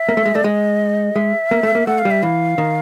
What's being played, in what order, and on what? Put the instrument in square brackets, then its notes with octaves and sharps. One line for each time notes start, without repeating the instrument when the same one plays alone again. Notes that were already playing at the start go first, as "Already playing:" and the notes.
Already playing: [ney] E5
[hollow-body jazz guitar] A#3
A3
G#3
[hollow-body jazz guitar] A3 [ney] D5
[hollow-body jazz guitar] G#3 [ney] D#5
[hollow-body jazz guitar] G#3 [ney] E5
[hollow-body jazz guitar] A#3
A3
A#3
[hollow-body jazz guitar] A3 [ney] F#5
[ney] F5
[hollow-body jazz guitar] G3
[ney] E5
[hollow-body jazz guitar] E3 [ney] F5
[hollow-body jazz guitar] D#3